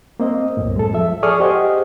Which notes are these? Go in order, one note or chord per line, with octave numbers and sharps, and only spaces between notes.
A#3 C4 D#5
C2 F#2 A2
G#3 A4
F3 E5
G#4 A4 D5 C#6 D#6 F6
G4 G#4 C5 D#5 F#5